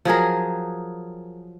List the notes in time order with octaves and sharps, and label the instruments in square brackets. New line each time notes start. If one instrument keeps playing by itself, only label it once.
[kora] F3 F#3 G#4 A#4